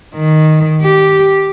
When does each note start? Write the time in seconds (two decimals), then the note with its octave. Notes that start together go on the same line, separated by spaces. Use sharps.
0.15 D#3
0.82 G4